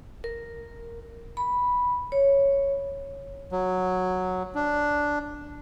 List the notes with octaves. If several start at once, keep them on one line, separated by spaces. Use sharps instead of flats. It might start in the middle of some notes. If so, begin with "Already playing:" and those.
A#4
B5
C#5
F#3
D4